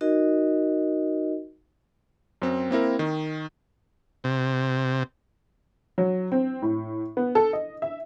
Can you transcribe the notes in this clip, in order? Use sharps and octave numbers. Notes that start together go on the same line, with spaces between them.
D#4 F#4 A#4 D#5
F#2 C4
A#3 C4 E4 A#4
D#3
C3
F#3
C4
A2
B3
A4
D#5
E5